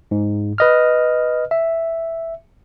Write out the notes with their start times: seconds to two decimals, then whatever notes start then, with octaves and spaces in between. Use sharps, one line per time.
0.11 G#2
0.58 B4 D#5 F6
1.51 E5